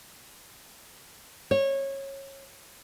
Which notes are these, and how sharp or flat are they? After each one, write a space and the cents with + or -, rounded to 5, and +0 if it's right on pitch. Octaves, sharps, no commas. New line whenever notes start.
C#5 -20